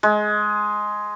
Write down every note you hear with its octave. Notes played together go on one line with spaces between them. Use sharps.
G#3